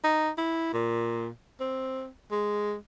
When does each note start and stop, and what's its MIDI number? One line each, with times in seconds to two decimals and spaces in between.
0.04 0.30 63
0.38 0.73 64
0.73 1.29 46
1.60 2.08 60
2.31 2.75 56